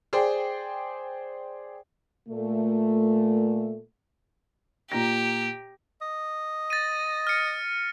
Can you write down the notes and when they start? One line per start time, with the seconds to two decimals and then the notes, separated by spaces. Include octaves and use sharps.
0.13 G#4 C5 D5 G5 C6
2.29 A#2 A3
4.92 A#2 G4 A#5 A#6
6.02 D#5
6.70 A6 A#6 D#7
7.27 F6 C#7